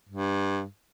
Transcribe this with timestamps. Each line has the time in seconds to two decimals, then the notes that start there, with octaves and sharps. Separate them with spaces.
0.09 G2